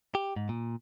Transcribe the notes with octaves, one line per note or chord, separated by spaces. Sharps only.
G4
G#2
A#2